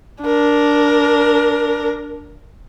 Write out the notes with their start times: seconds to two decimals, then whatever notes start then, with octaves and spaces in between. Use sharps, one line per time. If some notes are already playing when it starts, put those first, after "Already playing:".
0.22 D4 A#4